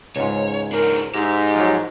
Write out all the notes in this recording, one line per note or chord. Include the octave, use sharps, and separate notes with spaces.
C#2 G#2 C#5
D4 D#4 A#4 C5
G#2 D#4 G4 E5 A#5
F3 F#3